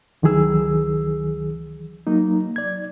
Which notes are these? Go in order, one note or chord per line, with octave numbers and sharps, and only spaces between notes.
C#2 D#3 E3 F#3 G#4 E6
F#3 A#3 D#4
D5 G#6